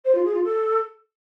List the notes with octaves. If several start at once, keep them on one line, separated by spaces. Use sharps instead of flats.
C5
F4
G#4
F4
A4